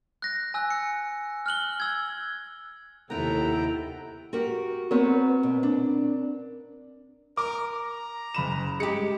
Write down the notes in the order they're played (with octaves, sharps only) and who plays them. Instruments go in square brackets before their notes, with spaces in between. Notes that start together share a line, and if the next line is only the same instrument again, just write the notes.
[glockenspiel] F#6 A#6
G#5 E6 F#6
C#7
F6 F#6 F#7 G7
E6 G#6
[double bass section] D#2 C3 [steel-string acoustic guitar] B3 E4 [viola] A4 [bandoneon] G5 A#5
[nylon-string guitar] F#4 G4 A#4
[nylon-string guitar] B3 C5 C#5 [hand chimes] C4 A#4
[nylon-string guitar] B2
D4
[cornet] A#4 [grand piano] D6
[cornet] A#5
[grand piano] F#1 B5 E7
[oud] G#3 G4 [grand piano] C#7